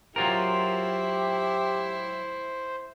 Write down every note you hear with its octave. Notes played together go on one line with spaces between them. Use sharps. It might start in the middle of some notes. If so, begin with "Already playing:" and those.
F#3 E4 F4 G4 A#4 C5